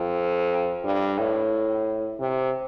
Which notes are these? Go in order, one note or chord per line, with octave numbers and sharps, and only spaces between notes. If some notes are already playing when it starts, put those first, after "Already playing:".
Already playing: F2
G2
A2
C3